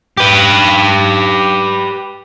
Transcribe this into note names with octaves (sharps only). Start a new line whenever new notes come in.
G4 B4